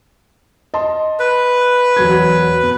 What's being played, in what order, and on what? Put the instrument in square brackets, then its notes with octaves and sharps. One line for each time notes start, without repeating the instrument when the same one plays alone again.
[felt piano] D#5 A5 C6
[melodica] B4
[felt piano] E1 F#3 G#6
B2